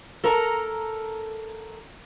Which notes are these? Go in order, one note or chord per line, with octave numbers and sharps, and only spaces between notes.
A4 A#4 A5 A#5